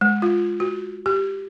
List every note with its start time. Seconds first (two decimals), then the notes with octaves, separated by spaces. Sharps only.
0.01 G#3
0.22 F4
0.60 F#4
1.06 G4